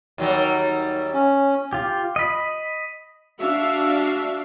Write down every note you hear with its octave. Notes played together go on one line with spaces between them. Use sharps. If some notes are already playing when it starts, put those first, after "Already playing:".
D#2 F#3 G3
C#4
F4 G4
D#5 B5
D4 F#4 E5 F5